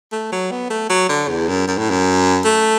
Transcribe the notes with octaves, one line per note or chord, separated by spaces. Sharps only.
A3
F#3
B3
A3
F#3
D3
E2
F#2
F#2
A2
F#2
A3